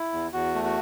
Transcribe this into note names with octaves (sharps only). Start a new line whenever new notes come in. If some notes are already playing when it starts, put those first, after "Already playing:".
Already playing: E4
E2
E2 F#4
A3
F#4